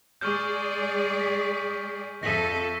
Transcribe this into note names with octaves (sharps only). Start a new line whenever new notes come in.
G#3 G#4 D5 C#6 F6 G6
B6
F2 A4 E5 A#6 B6 D#7